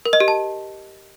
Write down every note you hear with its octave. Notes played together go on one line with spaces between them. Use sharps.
A#4
D#5
G4
A5